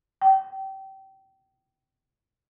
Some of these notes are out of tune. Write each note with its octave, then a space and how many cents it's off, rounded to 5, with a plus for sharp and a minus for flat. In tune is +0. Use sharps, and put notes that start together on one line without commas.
G5 -25